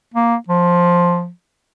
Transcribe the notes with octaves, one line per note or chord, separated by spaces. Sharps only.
A#3
F3